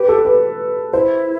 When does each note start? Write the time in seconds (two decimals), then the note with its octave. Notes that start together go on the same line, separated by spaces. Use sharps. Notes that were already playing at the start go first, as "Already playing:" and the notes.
Already playing: G4 B4
0.09 A4
0.25 B4
0.93 E4 C5